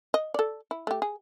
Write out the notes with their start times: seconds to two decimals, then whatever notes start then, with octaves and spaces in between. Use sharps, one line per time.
0.14 D#5
0.34 A4 D5
0.71 E4
0.87 A3 G4
1.02 G#4